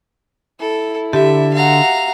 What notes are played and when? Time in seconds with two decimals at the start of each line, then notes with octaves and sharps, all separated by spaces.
0.60 E4 A4
1.13 D3 G4 E5
1.54 F#4 E5 F5 A#5